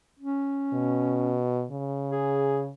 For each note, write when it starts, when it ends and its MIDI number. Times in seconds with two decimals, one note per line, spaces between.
0.19 1.40 61
0.73 1.66 47
1.71 2.71 49
2.09 2.67 68